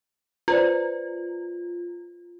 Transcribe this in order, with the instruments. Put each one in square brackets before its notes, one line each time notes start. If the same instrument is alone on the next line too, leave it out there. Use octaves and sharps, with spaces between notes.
[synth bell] F4 [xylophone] B4 C5 D5